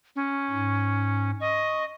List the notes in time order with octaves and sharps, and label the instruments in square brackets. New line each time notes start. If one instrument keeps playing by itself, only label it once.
[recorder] C#4
[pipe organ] G#2
[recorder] D#5 [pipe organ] C#6